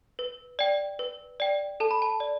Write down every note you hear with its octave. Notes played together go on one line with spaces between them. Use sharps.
B4
D5 G5
B4
D5 G5
A4 A5
B5
A5
D5